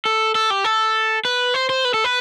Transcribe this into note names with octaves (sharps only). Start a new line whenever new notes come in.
A4
A4
G4
A4
B4
C5
C5
B4
A4
B4